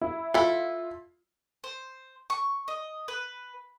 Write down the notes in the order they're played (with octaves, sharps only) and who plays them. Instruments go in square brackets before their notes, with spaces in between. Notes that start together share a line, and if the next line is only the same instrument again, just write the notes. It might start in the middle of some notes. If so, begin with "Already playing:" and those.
[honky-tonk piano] E4
[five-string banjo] E4 A4 [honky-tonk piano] F4
[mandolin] C5
C#6
D#5
B4